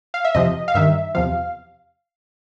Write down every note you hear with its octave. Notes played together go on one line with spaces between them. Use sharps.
F5
E5
F2 C3 F3 D#5
F5
G2 D#3 E5
E2 C3 F3 F5